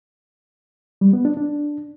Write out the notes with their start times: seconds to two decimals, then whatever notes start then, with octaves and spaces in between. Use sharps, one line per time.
1.01 G3
1.13 B3
1.25 D4
1.37 D4